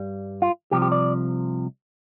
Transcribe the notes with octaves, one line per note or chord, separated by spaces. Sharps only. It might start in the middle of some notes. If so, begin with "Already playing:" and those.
Already playing: G2 G3
F4
C2 C3 F3 G4
G4
D5